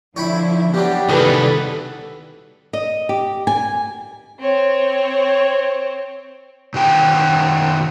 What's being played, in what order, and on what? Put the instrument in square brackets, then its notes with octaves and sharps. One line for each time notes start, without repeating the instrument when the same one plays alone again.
[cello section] D3 F3 E4 [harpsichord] C#5 G5 B5
[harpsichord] F#3 G3 [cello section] B3 D4 [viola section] G4
[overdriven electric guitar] C2 D#3 [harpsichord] B2 E3 [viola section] A4 B4
[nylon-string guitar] D#5
G4
G#5
[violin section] C4 C#5
[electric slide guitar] B2 D#3 F#4 G5